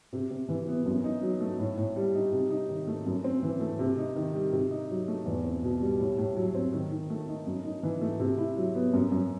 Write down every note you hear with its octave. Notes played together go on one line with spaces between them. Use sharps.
C3
C3
E3
B3
F#2
D#4
F#3
A3
A2
A2
G3
D#4
C3
D#4
D#3
A3
F#2
C4
E3
A3
C3
D#4
D#3
G3
C3
D#4
F#3
A3
E2
C4
B2
G3
A2
A2
F#3
C4
D#3
D#3
A3
D#4
F#2
D#4
E3
A3
C3
E4
F#3
B3
F#2
F#2